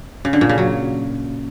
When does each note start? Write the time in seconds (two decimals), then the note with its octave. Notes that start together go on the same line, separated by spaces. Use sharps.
0.25 C#3
0.33 D3
0.41 A#2
0.49 C#3
0.58 F#3